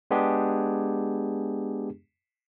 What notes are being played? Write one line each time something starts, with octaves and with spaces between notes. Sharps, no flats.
G#3 B3 D4 G4 G#4